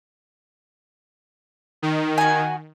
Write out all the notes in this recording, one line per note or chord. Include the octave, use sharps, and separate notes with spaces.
D#3
F#4 G#5